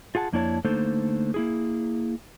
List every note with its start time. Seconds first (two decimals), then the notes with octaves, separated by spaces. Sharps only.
0.15 F4 G#4 F#5 A5
0.33 F2 A#3 D4 E4 C#5 A5
0.65 D3 A3 A#3 D#4 A4 C5
1.34 A#3 E4 G#4